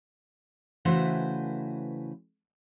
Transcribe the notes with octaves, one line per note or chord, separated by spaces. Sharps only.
C#3 E3 A3 F#4 B4 C5